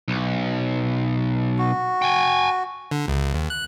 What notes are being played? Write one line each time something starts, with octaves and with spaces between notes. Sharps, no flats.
B1
F#4
G5 G#5
D3
C#2
D#2
F#6